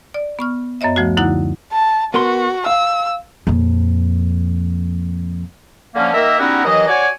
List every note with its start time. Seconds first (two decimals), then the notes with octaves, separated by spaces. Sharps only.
0.14 D5
0.39 B3 C#6 F6
0.81 F#2 B3 C#5 D#5 E5
0.96 D2 F3 A3 F#4
1.17 F#2 D3 D#4 E4 F#5 F#6
1.73 A5
2.14 B3 F#4 A#4 C6
2.66 F5 E6
3.47 F2 A#2
5.95 D3 F3 A#3 C#4
6.13 D#3 A#3 A#4 D#5 E5
6.39 G3 B3 C#4 D#4 E4 F#4
6.64 D#2 E3 F#3 D#5
6.88 F#4 C#5 D5 G#5